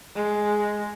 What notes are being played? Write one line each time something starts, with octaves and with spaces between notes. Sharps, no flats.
G#3